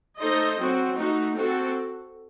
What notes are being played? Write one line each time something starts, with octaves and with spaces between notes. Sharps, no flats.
A3 D#4 A4 C5 D#5
F#3 C4 F#4
A3 D#4 F#4
C4 F#4 A4